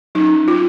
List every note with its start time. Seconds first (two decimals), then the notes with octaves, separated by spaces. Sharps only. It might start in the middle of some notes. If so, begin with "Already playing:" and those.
0.15 F#3 C#4 D#4
0.48 F4